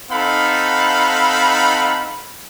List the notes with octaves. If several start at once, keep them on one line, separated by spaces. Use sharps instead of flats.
C4 D#4 A4 F5 F#5 B5